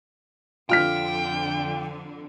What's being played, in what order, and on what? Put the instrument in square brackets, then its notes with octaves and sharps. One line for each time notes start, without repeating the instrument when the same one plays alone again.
[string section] F2 D3 [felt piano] F4 F6 B6 [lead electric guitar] G5